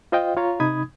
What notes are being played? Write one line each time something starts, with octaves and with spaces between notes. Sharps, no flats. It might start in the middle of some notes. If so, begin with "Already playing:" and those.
F4 C5 D#5 F5 G5
F4 C#5 F5 A#5
C3 D#4 B5 D#6 G#6